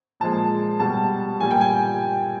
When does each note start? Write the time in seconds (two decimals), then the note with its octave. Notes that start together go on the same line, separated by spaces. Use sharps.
0.20 A#2 F3 G#3 A5
0.80 B2 G3 A5
1.40 A#2 G3 G#5
1.51 G5
1.61 G#5